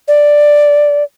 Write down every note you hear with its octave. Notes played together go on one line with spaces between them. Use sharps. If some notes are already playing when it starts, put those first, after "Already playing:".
D5